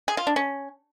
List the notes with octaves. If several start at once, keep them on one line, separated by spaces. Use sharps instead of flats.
G#4
F4
D4
C#4